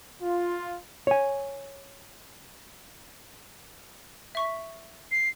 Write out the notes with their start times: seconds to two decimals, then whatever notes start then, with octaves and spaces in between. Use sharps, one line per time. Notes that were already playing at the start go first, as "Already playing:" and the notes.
0.23 F4
1.07 C#5 G#5
4.35 E5 C#6 B6
5.11 C7